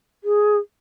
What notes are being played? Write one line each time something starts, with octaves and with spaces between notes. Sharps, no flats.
G#4